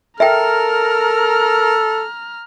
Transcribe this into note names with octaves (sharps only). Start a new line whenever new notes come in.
A4 A#4 E5 G5 A#5 F6